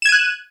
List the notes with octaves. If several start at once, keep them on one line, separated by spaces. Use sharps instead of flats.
F#6 G#6 D#7 E7